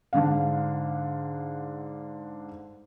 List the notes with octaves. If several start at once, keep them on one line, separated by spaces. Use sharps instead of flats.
G#2 D3 D4 F5